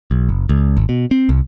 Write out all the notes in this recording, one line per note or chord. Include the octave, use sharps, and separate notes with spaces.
B1
F#1
C#2
G#1
B2
C4
C2